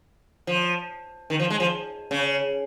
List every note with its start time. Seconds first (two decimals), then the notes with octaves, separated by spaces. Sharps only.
0.47 F3
1.30 D#3
1.39 F3
1.50 G#3
1.60 F3
2.11 C#3